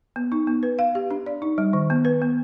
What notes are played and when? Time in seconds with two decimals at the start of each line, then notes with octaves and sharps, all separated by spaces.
0.16 B3
0.32 D#4
0.47 B3
0.63 B4
0.79 F5
0.95 G4
1.11 D4
1.26 D5
1.42 D#4
1.58 G3
1.73 D#3
1.90 B3
2.05 B4
2.22 B3